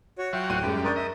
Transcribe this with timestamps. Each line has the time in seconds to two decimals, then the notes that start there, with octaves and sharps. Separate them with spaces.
0.19 F#4 C#5
0.33 F#3 F4 F#4 E5 G5
0.50 D1 F#6 D#7
0.63 F#2 G3 G#3
0.84 D4 A#4 D5 C#6 D#6 G6
0.96 D#5 E5